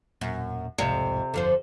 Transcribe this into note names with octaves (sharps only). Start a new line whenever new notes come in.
E1 F#2 A#2
E1 C2 F2 G#2 C3
G1 F2 D3 F3 C5